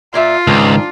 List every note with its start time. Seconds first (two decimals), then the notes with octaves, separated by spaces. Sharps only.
0.14 A#2 F4 D5 E5
0.47 C#2 G#2 D#3 D4